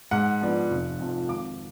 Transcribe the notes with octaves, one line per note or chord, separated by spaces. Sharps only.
G#2 F#5
F3 B3 D4
F1
F2 F3
G#1 D6